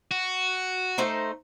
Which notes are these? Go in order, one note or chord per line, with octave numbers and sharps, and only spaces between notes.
F#4
A3 D#4 C5